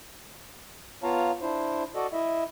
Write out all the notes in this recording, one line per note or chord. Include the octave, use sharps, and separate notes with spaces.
B3 F4 C#5 F5 A5 A#5
D4 E4 C5
F#4 A4 D5 D#5
E4 D#5 E5